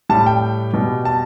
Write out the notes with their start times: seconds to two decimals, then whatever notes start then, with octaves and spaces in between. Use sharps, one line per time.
0.09 A2 G3 A5
0.26 G5
0.73 B2 G3
1.05 A5